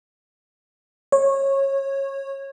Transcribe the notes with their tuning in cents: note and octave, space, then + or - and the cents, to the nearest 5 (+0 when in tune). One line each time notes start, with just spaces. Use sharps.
C#5 -20